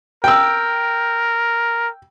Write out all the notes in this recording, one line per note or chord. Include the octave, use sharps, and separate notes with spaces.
A#4 G5 E6